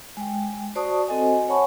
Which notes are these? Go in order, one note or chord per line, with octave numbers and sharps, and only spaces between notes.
G#3 G5
F#4 C5 D5 A5 C#6 D#6
C4 F#4 A4 C5 D#5 G#5
C#5 F#5 G#5 A5 B5 C#6